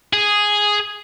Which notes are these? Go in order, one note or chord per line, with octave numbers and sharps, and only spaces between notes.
G#4